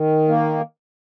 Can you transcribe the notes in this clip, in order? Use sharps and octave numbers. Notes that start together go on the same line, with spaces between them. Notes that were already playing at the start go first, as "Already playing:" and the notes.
Already playing: D#3
A#3